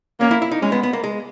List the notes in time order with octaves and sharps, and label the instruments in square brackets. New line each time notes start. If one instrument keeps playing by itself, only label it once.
[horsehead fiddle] A#3 [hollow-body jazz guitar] C#4
[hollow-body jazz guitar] E4
E4
D#4
[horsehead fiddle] G#3 [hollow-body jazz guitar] C#4
[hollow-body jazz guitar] B3
B3
A#3
G#3